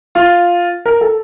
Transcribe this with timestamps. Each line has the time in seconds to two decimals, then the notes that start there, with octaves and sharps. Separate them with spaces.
0.15 F4
0.86 A#4
1.01 A4